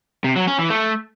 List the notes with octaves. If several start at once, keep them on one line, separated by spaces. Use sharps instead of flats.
C3
F#3
C#4
E3
A3